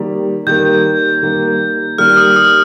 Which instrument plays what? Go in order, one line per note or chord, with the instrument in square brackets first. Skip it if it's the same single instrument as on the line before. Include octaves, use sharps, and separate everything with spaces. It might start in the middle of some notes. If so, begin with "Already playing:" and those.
Already playing: [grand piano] D#3 G3 A#3
[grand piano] D#3 G3 A#3 [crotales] G6
[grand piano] D#3 G3 A#3
[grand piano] D#3 G3 A#3 [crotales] F6
[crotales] D#6
D#6